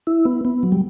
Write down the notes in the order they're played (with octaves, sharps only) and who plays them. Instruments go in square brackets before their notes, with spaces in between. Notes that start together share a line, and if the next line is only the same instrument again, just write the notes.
[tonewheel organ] E4
B3
B3
F#3
G3